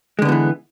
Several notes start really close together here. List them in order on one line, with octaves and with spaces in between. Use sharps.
G#3 D3 B3 F3 E3